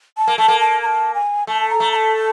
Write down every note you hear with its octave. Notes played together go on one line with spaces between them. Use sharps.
A5
A#3
A3 A5
A#3
A5
A#5
A5
G#5
A3 A5
A#5
A3
A#5
A5